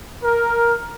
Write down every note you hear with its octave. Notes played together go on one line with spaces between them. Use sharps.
A#4